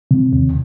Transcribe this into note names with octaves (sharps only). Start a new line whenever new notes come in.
C3
D#2